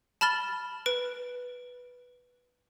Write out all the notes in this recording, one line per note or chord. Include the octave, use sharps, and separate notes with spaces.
A5 B5 F6 A6 G7
B4 D7